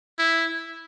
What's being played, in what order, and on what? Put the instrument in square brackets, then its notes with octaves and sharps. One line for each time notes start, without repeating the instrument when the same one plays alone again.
[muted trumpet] E4